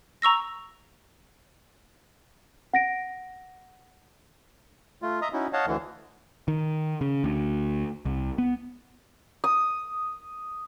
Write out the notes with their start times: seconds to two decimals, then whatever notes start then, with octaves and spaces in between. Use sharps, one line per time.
0.22 A#5 C#6 E6 A#6
2.74 F#5 A#6 D7
5.02 A3 F4
5.22 D#5 E5 A#5 D#6
5.33 C#4 D#4 E4 F#4
5.53 C#5 D#5 F5 F#5 A5
5.67 D2 D3 E3
6.48 D#3
7.01 C#3
7.24 D2
8.05 C2
8.38 B3
9.44 D#6